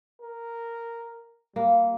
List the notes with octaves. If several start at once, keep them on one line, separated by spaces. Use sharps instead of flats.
A#4
G3 A#3